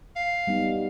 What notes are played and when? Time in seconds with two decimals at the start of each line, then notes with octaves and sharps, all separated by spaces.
0.16 F5
0.47 G3 B3 D#4